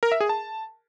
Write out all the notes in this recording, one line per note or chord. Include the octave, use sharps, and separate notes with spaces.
A#4
E5
G#4
A5